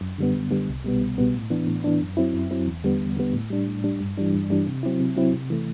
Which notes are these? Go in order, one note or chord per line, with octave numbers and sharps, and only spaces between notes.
F#2
D3 G3 B3
F#2
D3 G3 B3
C2
B2 G3 B3
C2
B2 G3 B3
A2
E3 B3 D4
A2
E3 B3 D4
F#2
F#3 C4 E4
F#2
F#3 C4 E4
E2
D3 G3 B3
E2
D3 G3 B3
A2
G3 D4
A2
G3 D4
G2
E3 G3 D4
G2
E3 G3 D4
C3
F#3 C4 E4
C3
F#3 C4 E4
C3
E3 A3